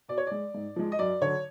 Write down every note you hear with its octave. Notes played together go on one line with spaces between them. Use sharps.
B2 D5
C#5
G#3 D5
G#2
F3 G#3
D#5
F#2 D5
D3 F#3 C#5